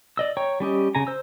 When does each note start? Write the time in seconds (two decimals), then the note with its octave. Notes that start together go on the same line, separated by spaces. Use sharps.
0.17 D5 D#5 E6
0.37 C#5 G5 A#5 C#6
0.60 G3 C#4 G4 D#5
0.95 C#3 G#5 A#5
1.07 C5 E6